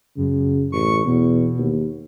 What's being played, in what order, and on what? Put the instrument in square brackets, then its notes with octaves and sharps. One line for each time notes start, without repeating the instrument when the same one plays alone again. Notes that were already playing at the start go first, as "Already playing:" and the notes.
[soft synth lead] F#2 [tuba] C#3
[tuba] A1 [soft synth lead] C#6
[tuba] E2 [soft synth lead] B2
[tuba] D#2